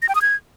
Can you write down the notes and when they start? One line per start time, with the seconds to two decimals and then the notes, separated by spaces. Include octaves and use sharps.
0.02 A#6
0.09 G5
0.15 D#6
0.22 G#6